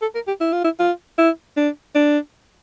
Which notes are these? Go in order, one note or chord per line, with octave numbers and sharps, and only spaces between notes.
A4
A#4
G4
E4
F4
E4
F4
E4
D4
D4